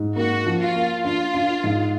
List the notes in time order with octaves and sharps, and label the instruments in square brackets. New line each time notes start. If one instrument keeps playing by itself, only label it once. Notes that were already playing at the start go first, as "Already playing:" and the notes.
Already playing: [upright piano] G#2
[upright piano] A#3 [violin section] F#4
[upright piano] F3
[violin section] F4
[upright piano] A#3
[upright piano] D4 [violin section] F4
[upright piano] D4
G#2